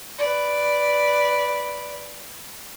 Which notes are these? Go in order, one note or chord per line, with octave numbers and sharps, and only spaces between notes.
B4 D5